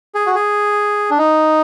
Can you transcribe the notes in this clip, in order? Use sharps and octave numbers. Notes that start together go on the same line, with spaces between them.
G#4
F#4
G#4
D4
D#4